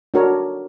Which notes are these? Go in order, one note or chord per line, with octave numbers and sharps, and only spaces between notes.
D4 F#4 A#4 C#5